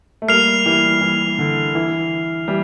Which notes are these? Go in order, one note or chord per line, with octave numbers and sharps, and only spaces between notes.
A3
G3 A#3 F6 C7 F7
E3 G3
E3
D3
E3
E3 G3